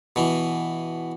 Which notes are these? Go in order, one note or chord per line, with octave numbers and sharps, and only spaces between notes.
B2 E3